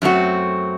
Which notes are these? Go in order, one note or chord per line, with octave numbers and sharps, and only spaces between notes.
F#2 F#3 A3 C4 F#4